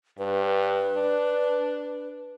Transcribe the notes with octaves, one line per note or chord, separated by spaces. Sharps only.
G2 B4
D4